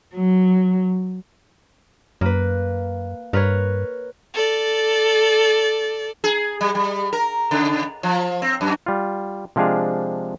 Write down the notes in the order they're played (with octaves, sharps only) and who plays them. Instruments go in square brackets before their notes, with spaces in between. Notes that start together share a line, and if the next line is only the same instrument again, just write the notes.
[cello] F#3
[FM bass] F#2 [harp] A#3 B4
[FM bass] G2 [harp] A#4 B4 C#5
[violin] A4 D5
[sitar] G#4
G3
G3
A#4
C#3
F3
C4
F#2
[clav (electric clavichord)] G3 F4
C3 F3 G#3 D4 G#4 F5